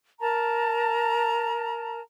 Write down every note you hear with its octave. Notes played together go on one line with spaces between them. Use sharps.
A#4 A5 A#5